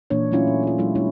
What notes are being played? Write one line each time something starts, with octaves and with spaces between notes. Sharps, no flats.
A#2 E3 A#3 D4 C#5
F#3 A3 C#4 E4 F4
A#2
F4 C#5
F#3 G#3 E4
G#3 B3 D4 E4 C#5